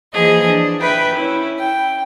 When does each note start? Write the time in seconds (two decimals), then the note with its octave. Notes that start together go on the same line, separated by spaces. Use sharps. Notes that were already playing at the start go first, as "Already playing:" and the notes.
0.13 E3 F3 A#3 G#4 D#5
0.44 D4
0.80 B4 E5 G5 B5
1.15 C#4 E4
1.58 G5